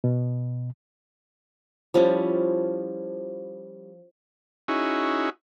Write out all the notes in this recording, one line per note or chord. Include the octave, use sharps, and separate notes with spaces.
B2
F3 G3 C#4 E4
C#4 D#4 E4 F#4 G#4